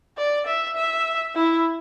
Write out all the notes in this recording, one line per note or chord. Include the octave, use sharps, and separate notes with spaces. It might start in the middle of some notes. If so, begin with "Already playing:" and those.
D5
E5
E5
E4